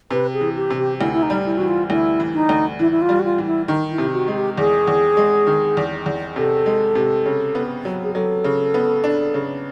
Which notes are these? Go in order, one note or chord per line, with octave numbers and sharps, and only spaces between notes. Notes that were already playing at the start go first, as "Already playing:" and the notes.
C3 B4
G#4
E3
G4
C3
G4
D2 E4
E4
D#4
G3
E4
E3 F#4
F4
D2 E4
E3
D#4
D2
E3 E4
E4
F4
G3
F#4
F4
E3
E4
D#3 D#4
E4
C3
F#4
G#3
G4
E2 G#4
E2
G#3
D#3
E2
E2
C3 A4
G#3
C3
C#3
B3
F#3
G#4
F#3 A4
C#3
B3
D4
C#3